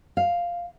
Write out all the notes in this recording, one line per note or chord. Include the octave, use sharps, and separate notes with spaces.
F5